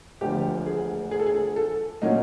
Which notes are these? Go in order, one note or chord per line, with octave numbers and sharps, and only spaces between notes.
E1 D2 D3 F3 G4
G#4
G#4
A4
G#4
A4
A#2 F#3 A#3 C#4 D#4